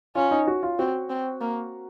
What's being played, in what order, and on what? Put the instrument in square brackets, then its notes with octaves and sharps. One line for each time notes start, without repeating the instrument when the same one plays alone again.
[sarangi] C#4 [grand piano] F4
[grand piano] D#4
F#4
F4
[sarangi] C4 [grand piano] F#4
[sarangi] C4
A#3